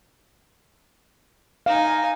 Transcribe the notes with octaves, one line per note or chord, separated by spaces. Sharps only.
D#4 F5 G#5